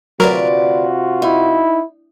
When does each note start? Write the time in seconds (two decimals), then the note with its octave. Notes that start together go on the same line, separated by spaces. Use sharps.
0.20 D2 C3 F#3 F4 F#4 A#4 B4 D5
1.22 D#4 E4